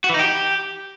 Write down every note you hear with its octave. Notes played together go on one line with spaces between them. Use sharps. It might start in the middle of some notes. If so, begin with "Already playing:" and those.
F#4
E3
D#4
G4